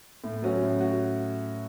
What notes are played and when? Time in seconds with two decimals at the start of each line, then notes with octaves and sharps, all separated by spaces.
0.24 A2
0.42 F#3 C#4 F#4
0.62 A2
0.81 F#4